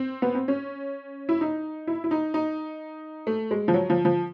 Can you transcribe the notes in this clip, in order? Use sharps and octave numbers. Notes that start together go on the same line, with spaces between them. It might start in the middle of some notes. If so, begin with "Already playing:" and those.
Already playing: C4
B3
C4
C#4
E4
D#4
E4
E4
D#4
D#4
A3
G#3
F3
F#3
F3
F3